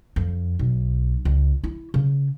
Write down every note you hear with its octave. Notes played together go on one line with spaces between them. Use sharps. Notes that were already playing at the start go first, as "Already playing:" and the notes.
F2
B1
C#2
E4
C#3